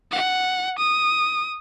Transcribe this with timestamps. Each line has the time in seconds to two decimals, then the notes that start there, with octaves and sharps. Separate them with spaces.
0.12 F#5
0.79 D#6